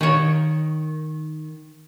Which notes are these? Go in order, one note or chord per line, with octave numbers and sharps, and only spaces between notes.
D#3 C#5